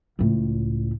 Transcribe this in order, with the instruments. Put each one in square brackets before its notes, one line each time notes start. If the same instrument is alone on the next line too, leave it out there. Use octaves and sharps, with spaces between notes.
[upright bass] C#2 A2